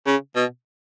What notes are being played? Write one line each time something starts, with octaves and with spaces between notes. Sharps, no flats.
C#3
B2